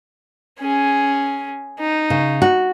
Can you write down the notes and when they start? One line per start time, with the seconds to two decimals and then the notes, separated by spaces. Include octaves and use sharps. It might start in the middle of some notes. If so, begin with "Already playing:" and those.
0.59 C#4 G#4
1.79 D#4
2.10 C#3
2.42 F#4